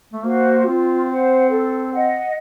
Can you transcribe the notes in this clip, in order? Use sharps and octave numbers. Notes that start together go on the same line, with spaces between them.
A3
A#3 F#4 C5 F5
C4 F4
C5 F#5
A4
D#5 F#5